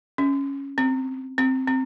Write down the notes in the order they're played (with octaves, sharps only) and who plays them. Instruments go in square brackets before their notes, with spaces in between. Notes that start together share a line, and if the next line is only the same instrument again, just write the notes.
[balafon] C#4
C4
C4
C4